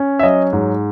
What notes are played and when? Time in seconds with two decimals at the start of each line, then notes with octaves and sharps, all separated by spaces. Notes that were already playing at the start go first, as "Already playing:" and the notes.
Already playing: C#4
0.19 E5
0.23 F#3 D#5
0.53 G#2